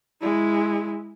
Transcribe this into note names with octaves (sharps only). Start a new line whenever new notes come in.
G#3 E4